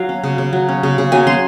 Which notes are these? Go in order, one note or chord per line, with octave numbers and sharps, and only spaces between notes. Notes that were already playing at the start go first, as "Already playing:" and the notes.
Already playing: F#3 F5
C#4
C#3
C#3
F#3
C#4
C#3
C#3
F#3 G#5
C#4 C6